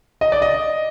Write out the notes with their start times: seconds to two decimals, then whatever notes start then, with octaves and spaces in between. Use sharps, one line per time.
0.21 D#5
0.32 D5
0.42 D#5